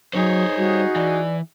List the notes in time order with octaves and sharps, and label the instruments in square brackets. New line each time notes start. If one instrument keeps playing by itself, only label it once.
[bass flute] F#3 [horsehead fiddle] D#4 G#4 [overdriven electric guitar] C5 C#5
[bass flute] G3 [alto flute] F#4
[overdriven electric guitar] E3 [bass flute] D5